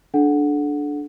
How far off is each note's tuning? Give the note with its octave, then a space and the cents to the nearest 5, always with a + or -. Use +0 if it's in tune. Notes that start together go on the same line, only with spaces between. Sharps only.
D4 +0 A4 -30 F#5 -10